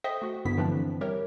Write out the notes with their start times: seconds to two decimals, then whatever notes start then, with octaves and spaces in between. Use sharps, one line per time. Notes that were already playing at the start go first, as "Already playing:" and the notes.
0.04 A4 C5 D#5 E5 G5 D#6
0.22 A3 F#4
0.45 G2 D3 B3 E4 B6
0.57 D3 E3 F3 A3 C4 D4
1.01 G3 G4 A#4 C#5 E5